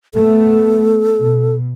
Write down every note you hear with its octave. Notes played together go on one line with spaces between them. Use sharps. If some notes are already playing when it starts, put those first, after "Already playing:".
A3 B3 A4
B2